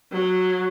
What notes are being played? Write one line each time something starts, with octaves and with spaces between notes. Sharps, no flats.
F#3